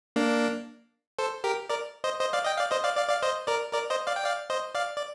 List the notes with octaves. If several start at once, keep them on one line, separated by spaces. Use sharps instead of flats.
A#3 D4
A4 C5
G4 A#4
A#4 D5
C5 D#5
C5 D#5
D5 F5
D#5 G5
D5 F5
C5 D#5
D5 F5
D5 F5
D5 F5
C5 D#5
A#4 D5
A#4 D5
C5 D#5
D5 F5
G5
D5 F5
C5 D#5
D5 F5
D5